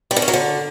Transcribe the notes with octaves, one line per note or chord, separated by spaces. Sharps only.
G3
D3
C#4
F#3
D3